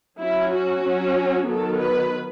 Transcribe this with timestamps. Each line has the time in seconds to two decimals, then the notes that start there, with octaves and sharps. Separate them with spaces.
0.20 F#3 C#4 E4
0.53 F#4
0.85 F#3 C#4
1.48 D#3 F#3 B3 A4
1.80 B4